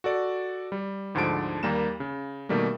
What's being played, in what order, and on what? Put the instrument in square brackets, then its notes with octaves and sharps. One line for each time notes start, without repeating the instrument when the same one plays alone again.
[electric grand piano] F#4 A4 D5
G3
D2 G#2 D3 F3 A5 D7
D#2 G3 A#3 A#5 E7
C#3
B2 D#3 G3 A3 A#3